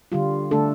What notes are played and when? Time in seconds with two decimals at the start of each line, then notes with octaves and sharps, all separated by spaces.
0.12 D3 G3 F4
0.51 D3 A3 D4 A4